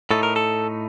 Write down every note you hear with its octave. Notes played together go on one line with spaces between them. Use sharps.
A2 A3 D#4 A4
A#4
A4